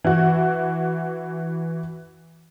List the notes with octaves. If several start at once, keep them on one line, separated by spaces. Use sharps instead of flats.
E3 F#4